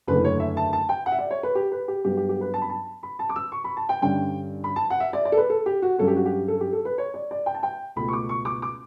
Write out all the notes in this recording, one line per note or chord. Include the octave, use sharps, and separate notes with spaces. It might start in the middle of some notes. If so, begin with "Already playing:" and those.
F#1 E2 D3 A3 B4
C#5
E5
A5
A5
G5
F#5
E5
D5
C#5
B4
G4
B4
G4
G2 F#3 B3 G4
G4
G4
B4
A5
B5
A5
B5
A5
D6
E6
C#6
B5
A5
G5
G2 D3 G3 C#4 G5
B5
A5
F#5
E5
D5
D5
A4
B4
A4
G4
F#4
G2 F#3 C#4 A4
G4
F#4
G4
A4
G4
A4
B4
C#5
D5
D5
G5
A5
G5
C#2 B2 A3 B5
C#6
D6
C#6
D6
D6